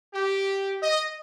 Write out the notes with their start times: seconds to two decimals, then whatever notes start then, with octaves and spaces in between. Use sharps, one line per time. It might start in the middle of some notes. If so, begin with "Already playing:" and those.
0.14 G4
0.82 D#5